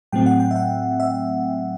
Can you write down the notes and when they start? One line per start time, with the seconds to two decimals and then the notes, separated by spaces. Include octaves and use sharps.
0.12 A2 F#3 A3 C4 G5
0.26 F#5
0.40 G5
0.51 E5
0.56 F#5
1.00 E5